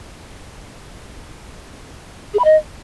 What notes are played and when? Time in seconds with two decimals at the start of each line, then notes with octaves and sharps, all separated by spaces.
2.34 G#4
2.39 B5
2.44 D#5